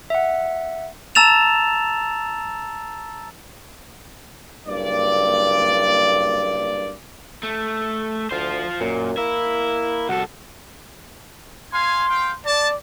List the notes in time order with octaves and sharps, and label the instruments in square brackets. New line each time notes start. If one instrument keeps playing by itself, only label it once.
[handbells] E5 F#5
[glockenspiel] A5 A#5 E6 A6 E7 F7
[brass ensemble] F#1 G2 A#3 D5
[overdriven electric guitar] A3
[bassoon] D2 [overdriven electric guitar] F4 C5
[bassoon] F#2 [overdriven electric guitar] A#2
[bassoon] A#3 [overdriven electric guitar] E4
[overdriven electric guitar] C2 A4 [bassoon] F#4
[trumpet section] F5 G#5 [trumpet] C6
[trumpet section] F5 G5
[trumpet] D5 [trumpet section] A5